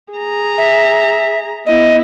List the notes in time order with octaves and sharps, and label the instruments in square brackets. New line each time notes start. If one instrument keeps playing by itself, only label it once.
[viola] G#4 A#5
[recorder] E5
[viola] B3 E4 [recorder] D#5